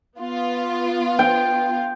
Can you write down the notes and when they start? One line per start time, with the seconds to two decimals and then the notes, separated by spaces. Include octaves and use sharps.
0.19 B3 F4
1.19 G5